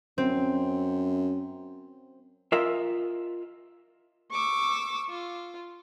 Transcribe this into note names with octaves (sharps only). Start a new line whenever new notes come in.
F#2 C4
F4 A#4 D#5 E5 G#5
C#6 D6 E6
F4